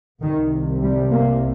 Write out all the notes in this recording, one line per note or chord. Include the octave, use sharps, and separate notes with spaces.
C2 C3 D#3
G3
A#3